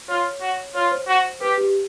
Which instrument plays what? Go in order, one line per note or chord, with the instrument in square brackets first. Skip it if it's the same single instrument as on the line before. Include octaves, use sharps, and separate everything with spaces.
[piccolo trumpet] F4 [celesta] C#5
[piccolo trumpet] F#4
[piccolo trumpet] F4 [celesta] C#5
[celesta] C5
[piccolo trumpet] F#4
[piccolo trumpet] G4 [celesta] B4
[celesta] G4